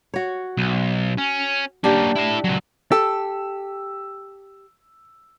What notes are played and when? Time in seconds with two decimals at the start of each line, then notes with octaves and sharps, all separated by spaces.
0.14 F#4 C#5
0.58 B1
1.18 C#4
1.84 A#3 C#4 D4 G4
2.15 E4 A5
2.44 C#2 F#3
2.92 G4 A4 E6